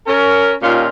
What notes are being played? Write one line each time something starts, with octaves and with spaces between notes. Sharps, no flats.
C#4 A#4
D#2 A#2 C#4 F4